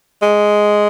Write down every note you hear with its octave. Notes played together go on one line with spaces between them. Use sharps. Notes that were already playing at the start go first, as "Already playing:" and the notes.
G#3